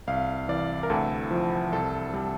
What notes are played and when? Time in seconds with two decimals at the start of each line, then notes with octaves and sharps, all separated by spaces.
0.07 C2 F5
0.48 E3 D5
0.83 A#4
0.90 D2 A4
1.31 F3
1.72 C2 A4
2.14 G3